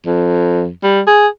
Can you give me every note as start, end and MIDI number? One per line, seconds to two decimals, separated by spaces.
0.06 0.70 41
0.83 1.01 55
1.07 1.27 68